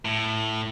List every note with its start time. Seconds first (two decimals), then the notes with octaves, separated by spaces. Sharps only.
0.05 A2